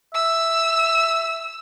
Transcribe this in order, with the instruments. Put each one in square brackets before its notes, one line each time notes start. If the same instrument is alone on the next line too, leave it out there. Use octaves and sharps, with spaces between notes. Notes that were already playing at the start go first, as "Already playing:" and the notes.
[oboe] E5 [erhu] E6